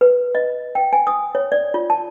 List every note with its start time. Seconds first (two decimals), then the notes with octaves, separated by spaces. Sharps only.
0.01 B4
0.35 D#5
0.75 G5
0.93 G#5
1.07 D#6
1.35 C#5
1.52 D5
1.74 F4
1.90 A5